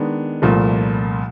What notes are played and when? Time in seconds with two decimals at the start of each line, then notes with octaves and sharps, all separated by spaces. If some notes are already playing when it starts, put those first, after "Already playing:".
Already playing: D#3 G#3 B3 D4
0.42 C2 A#2 F3 A3